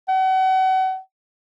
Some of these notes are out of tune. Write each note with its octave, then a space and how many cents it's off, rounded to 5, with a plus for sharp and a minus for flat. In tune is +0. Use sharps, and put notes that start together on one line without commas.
F#5 +35